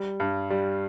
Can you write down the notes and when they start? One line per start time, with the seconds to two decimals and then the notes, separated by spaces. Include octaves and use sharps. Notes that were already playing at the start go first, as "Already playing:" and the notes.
Already playing: G3
0.20 G2
0.50 G3